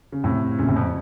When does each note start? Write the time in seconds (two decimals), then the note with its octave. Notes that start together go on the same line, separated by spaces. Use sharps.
0.12 C#3
0.24 A2 C3
0.58 A#2 C#3
0.68 A2 C3
0.76 F2